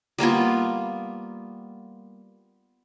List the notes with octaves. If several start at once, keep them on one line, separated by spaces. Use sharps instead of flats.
G3 A#3 B3 F4